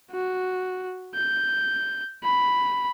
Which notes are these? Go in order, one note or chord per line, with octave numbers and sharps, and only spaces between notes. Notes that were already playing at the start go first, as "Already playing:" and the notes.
F#4
G6
B5